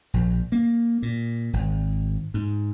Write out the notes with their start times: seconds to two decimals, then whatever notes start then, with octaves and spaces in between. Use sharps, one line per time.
0.14 A#1
0.52 A#3
1.02 A#2
1.53 G#1
2.34 G#2